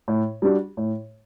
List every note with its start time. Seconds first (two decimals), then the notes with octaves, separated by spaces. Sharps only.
0.08 A2
0.42 G3 D4 F#4
0.77 A2